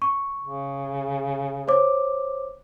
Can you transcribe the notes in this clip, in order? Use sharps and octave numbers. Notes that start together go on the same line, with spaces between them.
C#6
C#3
C5 C#5 D6